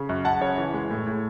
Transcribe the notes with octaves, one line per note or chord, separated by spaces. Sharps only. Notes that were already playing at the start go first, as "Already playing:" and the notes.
Already playing: C#3
F#2
F#2 F#5 A5
C#3 C#5
E3
G#3
A2
A2